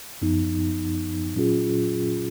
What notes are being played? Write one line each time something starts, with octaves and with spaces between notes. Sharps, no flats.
F#2 F3 B3 D#4
A#2 F#3 C#4 F4 G#4